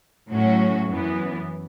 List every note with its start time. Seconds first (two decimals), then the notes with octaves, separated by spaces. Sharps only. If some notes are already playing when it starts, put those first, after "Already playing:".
0.30 A2 F#3 C#4 F#4
0.87 F#2 E3 B3